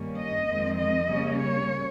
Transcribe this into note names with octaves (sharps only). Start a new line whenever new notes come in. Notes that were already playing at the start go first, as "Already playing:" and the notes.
Already playing: G2 D#3 G3 A#3 C#4
D#5
F2 D#3 G#3 C4
D#5
C#3 G3 A#3 C#4
C#5